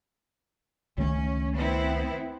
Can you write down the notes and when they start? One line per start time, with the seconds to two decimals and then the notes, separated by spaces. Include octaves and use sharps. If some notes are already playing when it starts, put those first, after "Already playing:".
0.98 C#2 D#3 A3 C#4
1.55 B3 C4 E4